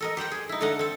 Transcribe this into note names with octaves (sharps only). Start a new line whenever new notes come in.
A4 A#4 D#5
G4 C5 F#5 G5
G#4
D#4 E4
D3 A3 A4 D#5 F5 F#5
C4 A4